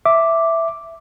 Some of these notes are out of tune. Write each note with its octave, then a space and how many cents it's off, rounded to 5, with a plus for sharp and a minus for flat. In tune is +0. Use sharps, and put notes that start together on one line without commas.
E5 +0 D6 +0